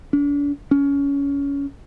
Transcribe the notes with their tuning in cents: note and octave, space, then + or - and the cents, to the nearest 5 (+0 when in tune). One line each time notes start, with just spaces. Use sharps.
D4 -40
C#4 +20